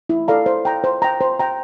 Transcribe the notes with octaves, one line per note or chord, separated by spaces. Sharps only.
E4
A4 D5 F5 A#5
C5
G5 A#5
C5
G5 A#5
C5
G5 A#5